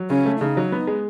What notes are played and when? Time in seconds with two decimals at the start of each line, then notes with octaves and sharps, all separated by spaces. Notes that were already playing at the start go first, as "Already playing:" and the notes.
Already playing: F#3
0.10 C#3 C#4
0.25 A3
0.40 C#3 D#4
0.57 F#3
0.72 B3
0.87 G#3